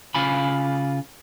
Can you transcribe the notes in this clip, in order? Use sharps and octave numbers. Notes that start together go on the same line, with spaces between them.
C#3 F4 G#5 B5